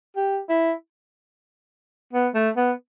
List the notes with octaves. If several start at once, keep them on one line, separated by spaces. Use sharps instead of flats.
G4
E4
B3
A3
B3